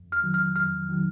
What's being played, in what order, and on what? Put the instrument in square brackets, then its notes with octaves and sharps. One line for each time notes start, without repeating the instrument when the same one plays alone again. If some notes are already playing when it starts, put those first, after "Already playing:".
Already playing: [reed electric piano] F2
[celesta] F6
[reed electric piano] D#3 F#3
[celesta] F6
[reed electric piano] F2 [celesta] F6
[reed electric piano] D#3 F#3